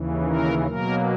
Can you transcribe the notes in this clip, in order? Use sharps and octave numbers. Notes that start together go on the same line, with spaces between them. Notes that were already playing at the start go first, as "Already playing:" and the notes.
Already playing: D#2 C#3 E3
A#4
B2 F#3 A#3 A#4